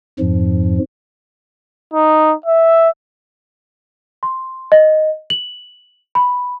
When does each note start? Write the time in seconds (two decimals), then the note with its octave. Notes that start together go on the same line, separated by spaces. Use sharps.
0.19 F2 G#2 F3
1.94 D#4
2.46 E5
4.23 C6
4.72 D#5
5.30 F#7
6.15 B5